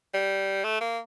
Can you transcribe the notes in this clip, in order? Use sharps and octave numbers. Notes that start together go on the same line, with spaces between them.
G3
A3
A#3